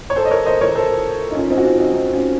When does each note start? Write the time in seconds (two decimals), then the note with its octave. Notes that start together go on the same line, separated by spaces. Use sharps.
0.10 C#5
0.16 A4 C5
0.25 D#5
0.31 A#4 C#5
0.46 C5 D#5
0.61 A#4 C#5
0.75 A4 C5
1.31 D#4
1.35 C#4 F4
1.50 C4 D#4
1.57 F#4
1.64 C#4 F4
1.78 C4 D#4
1.93 C4 D#4
2.13 C#4 F4